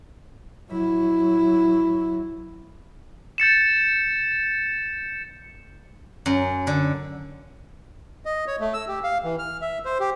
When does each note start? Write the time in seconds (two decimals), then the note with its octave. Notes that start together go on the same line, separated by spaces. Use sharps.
0.71 F#3 E4
3.38 G6 A6 C#7 E7
6.26 F#2
6.67 D3
8.25 D#5
8.47 C#5
8.60 A3
8.74 E6
8.88 G4
9.04 F5
9.24 E3
9.39 F6
9.62 E5
9.85 C5
10.00 G4